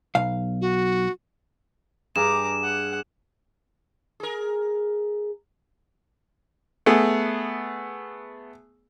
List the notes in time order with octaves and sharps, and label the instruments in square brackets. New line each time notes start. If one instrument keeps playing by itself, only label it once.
[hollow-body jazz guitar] B1 F5
[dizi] F#4
[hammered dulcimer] G2 G#4 [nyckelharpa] A#5 D6 [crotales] E7
[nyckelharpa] F#5
[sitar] G#4 A#4
[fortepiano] A3 B3 G#4